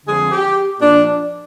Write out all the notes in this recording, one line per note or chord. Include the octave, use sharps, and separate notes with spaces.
F2 D3 F3 G#4
G4
A#2 F3 D4